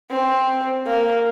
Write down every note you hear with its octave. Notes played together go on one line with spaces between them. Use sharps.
C4
A#3